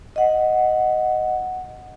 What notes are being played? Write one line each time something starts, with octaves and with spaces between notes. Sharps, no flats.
D#5 F#5